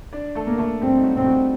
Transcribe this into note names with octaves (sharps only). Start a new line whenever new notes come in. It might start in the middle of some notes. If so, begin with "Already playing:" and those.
D4 D5
A3 A4
A#3
A3 A4
G3 C4 G4
D#4
F#3 F#4
C4
F#3 F#4